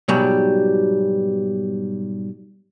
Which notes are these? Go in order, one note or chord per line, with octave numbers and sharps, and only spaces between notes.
G#2 B2 F#3 G3